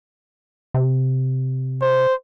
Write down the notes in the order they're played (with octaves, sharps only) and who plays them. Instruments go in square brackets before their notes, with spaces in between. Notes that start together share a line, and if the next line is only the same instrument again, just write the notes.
[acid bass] C3
[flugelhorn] C5